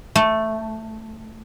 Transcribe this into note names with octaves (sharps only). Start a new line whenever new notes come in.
A3